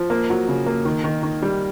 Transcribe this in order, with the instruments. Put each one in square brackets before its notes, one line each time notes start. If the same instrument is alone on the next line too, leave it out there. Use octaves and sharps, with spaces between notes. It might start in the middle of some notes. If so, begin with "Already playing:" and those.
Already playing: [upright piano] F3
A#3
F#3
C#3
A#3
D#3
D#3
D#3
G3